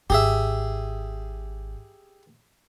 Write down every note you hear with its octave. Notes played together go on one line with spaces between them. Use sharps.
G#1 G4 G#4 E5